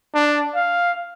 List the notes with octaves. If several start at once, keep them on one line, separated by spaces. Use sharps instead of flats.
D4
F5